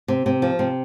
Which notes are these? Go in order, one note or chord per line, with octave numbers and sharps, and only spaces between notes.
C3
C3
F3
C3